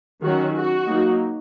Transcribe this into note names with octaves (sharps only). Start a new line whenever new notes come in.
D#3 F#3 C#4 F#4
F#4
F#3 A#3 D#4